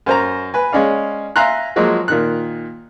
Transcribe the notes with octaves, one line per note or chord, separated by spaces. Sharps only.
F#2 C5 A#5
B4 G#5
G#3 C#4 D5 F5
E5 F5 G#5 A#5 C6 F#6
F3 F#3 G#3 A#3
A#2 D#3 F#6